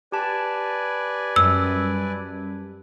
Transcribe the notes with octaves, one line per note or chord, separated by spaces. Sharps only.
G4 B4 D5 G#5 A5
F#2 G3 E6